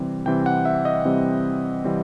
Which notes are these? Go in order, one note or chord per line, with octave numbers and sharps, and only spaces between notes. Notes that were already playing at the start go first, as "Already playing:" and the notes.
Already playing: C3 E3 G3 C4
C3 E3 G3 C4 G5
F#5
E5
D#5
C3 E3 G3 C4
C3 E3 G3 C4